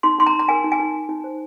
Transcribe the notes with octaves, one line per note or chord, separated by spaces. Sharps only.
D#4 C6
D#4 C6
A#5
D#4
A#5
A#4 G#5
D#4
G#5
D#4
D#4
D#4
C5